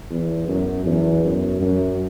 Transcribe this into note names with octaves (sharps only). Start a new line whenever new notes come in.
E2
F#2
E2
F#2
F#2